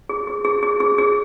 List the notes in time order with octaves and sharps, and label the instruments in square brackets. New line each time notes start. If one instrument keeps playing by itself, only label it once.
[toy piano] G#4
G#4
G#4
G#4
G#4
G#4